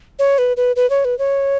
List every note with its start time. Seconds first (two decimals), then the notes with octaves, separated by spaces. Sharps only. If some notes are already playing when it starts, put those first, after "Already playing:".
0.19 C#5
0.38 B4
0.57 B4
0.76 B4
0.90 C#5
1.05 B4
1.19 C#5